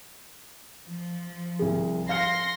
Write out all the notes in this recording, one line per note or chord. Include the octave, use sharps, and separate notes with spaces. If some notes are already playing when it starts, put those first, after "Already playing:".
F3
C2 G#4
F5 C6 F6 A#6 C#7